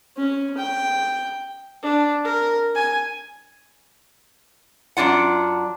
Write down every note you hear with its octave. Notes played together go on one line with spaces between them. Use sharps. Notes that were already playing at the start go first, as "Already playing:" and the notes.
C#4
G5
D4
A#4
G#5
F#2 B3 D4 F4 F#5